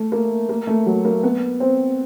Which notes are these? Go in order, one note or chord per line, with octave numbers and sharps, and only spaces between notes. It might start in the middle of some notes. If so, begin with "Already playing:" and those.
Already playing: A3
A#3
A#3
A3
F#3
A#3
B3
C4